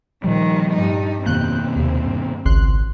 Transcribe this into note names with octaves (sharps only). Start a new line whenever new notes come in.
A#2 D#3 F3 G3
G2 D#4
F2 B2 D#3 A#3 C4 F#6 G6
D#2 C3
G2
G#1 C#2 C6 F#6